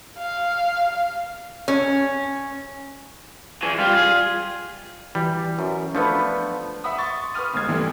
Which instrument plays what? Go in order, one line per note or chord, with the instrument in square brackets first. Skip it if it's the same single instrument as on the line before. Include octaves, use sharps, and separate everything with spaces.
[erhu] F5
[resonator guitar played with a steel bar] C#4
[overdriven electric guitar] E3 G#4
[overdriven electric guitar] G3 [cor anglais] F4
[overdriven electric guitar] G#4
[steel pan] E3 [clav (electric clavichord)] G3
[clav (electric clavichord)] F#2
[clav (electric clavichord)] F3 A3 B3 [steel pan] D4 B4
[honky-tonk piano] E5 F#5 B5 D#6
C6 C#6 A6
B4 C6 D#6 F6 D#7
G1 D2 G#3 G#6
G2 C3 E3 G3 A3 D4